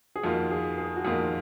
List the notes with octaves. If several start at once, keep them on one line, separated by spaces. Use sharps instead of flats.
G#4
F2 D#3 A#3 F4 F#4
G#4
G#4
F#4
F2 D#3 A#3 F4 G#4